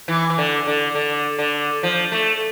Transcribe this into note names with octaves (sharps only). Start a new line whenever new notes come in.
E3
E3
D3
D3
D3
D3
F3
A3